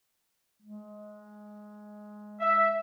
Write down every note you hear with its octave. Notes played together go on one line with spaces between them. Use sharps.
G#3
E5